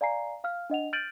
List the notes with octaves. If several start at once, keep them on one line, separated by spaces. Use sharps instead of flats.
D5 F5 G#5 A#5 C7
F5 F6
D4 D#5 F#5 F7
F6 G6 A6 D7 D#7 F#7